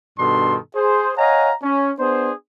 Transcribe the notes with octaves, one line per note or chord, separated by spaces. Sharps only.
G2 B2 D#3 D4 A4 C6
G#4 C5
C#5 D#5 F5 F#5 G#5 A#5
C#4
B3 D4 G#4 C5